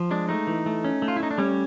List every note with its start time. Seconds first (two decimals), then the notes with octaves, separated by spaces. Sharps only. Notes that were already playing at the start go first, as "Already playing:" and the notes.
Already playing: F3
0.11 G#3 D4
0.29 A3 D#4
0.47 E3
0.66 A3
0.84 C#4
1.02 A3
1.08 F4
1.16 E4
1.20 A3 D#4
1.31 D4
1.38 G3 C#4